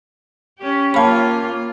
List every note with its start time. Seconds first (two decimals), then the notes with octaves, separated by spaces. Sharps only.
0.59 C#4 G4
0.94 A#3 C#4 F4 C#5 F5 G5 A5 B5